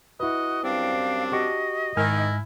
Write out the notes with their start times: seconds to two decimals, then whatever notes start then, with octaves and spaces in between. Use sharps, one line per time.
0.20 E4 F#4 B4 D#5
0.64 F#2 G3 C4 D4 F5
1.32 F#4 G4 D#5 C#6
1.97 G#2 D#3 E4 G#5 F6